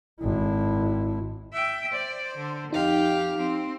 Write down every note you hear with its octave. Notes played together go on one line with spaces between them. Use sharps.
G#1 E4
E5 G5
C5 D5
D3
F2 D#4 G4 F5
C4